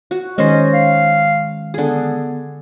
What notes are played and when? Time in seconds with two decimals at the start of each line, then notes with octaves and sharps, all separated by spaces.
0.11 F#4
0.38 D#3 G#3 C#4 C5 D#5
0.73 F5
1.74 D3 B3 G#4